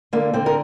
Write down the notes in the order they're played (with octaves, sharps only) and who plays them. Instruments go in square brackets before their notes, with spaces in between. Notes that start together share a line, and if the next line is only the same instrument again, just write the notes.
[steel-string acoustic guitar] D3 A#3
D3 C4
A#4